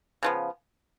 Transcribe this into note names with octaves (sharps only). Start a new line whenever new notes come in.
C#3 F3 B3